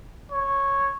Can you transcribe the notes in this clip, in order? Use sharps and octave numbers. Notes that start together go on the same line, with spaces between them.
C#5